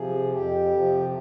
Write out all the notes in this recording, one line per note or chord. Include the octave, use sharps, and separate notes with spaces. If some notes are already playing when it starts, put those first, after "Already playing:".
Already playing: C3 F3 G#4
F2 G4
C3 F3